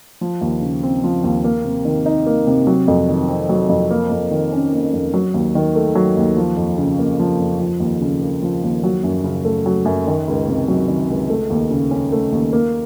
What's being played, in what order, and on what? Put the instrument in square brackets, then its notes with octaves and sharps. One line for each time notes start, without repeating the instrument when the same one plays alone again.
[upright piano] F3
D#2
C#3
C4
F3
D#2
A#3
C3
D#3
D#4
A#3
C3
F#3
F2
D#3
C4
F#3
F2
A#3
F2
D#3
C#4
A#3
F2
F#3
D#2
D#3
A3
F#3
D#2
F3
F2
C#3
A#3
F3
F2
F3
D#2
C#3
A#3
F3
D#2
F#3
F#2
C#3
A3
F#3
F#2
D#3
C#2
C3
F#3
D#3
C#2
A3
D#2
C#3
C#4
A3
D#2
A#3